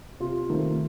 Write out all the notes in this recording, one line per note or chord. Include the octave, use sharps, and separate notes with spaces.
C3 F4
D#3 A3 C4